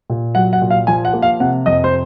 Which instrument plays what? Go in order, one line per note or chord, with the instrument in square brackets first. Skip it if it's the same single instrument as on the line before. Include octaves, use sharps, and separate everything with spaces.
[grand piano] A#2
F#3 F#5
F#5
A#2
F5
F3 G#5
F#5
A#3
F5
C3 F#5
F2 D#5
C5